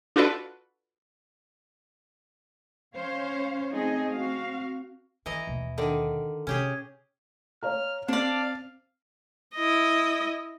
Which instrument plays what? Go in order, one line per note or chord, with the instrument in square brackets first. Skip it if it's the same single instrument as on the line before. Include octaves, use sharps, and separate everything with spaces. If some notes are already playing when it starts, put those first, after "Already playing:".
[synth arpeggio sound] D4 F4 F#4 A4 B4 D5
[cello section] C#4 C5 C#5 F5
A3 C4 C#4 D#4 G#4 D#5
C4 F#4 F5
[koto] E3 D#5 A#5 [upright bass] E4
[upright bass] D#2 B2
[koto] D3 D#3 D5
[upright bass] C3 [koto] C#4 G4 G#4
[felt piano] C#5 F5 A#5 [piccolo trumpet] F6
[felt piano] C4 [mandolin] D4 D5 [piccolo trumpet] F5
[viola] E4 D#5